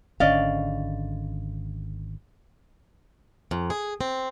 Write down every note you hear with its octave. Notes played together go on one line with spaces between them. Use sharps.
G#1 D3 C#4 D5 D#5 F5
F2
G#4
C4